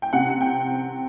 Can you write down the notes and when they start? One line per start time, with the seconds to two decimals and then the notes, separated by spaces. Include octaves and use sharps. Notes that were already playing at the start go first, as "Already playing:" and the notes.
0.02 G5
0.13 C3 F#5
0.41 G5